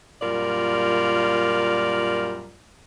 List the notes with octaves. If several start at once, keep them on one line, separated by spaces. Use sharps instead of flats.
F#2 A#2 G3 F4 A#4 D5